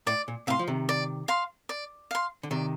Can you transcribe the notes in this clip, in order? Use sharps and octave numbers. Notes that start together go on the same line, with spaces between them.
A2 D5
A#2
A2 C3 F5 C6
F3
C3 D#3
D5
F5 C6
D5
F5 C6
D3
C3 D#3 D5